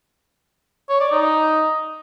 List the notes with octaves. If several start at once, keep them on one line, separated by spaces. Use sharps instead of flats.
C#5
D5
D#4